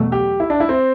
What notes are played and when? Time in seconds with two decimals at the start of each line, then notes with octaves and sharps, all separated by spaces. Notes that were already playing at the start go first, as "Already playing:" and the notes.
Already playing: E2 B2 F#3 A3
0.12 G4
0.40 E4
0.50 D4
0.60 E4
0.69 C4